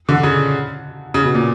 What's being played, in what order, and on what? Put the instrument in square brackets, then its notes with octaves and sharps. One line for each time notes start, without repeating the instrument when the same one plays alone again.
[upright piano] D3
C#3
C#3
B2
A#2